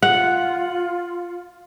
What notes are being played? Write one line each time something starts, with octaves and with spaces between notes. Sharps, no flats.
F4 F#5